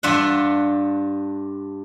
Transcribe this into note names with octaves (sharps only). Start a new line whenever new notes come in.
G2 D4 F4 E5 F#5